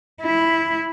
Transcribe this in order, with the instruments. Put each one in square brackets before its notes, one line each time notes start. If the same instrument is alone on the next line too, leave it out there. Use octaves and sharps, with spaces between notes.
[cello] E4